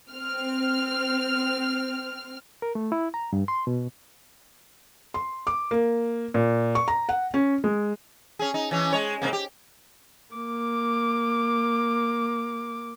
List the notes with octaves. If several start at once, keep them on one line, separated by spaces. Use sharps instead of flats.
C4 F6
A#4
A3
E4
A#5
G2
C6
B2
C6
D6
A#3
A#2
C#6
A#5
F#5
C#4
G#3
C#4 G#4
D#4
E3 C#4
G#3 C#5
G#2 C3 A#3
G4
A#3 D6